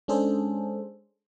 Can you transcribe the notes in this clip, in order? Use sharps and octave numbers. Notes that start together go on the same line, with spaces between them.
G#3 C#4 D4 G#4 A4 C5